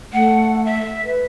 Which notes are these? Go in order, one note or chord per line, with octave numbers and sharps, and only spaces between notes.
A3 F#5
E5
B4